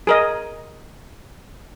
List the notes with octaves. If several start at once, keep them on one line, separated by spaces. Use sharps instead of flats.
G#4 A#4 D#5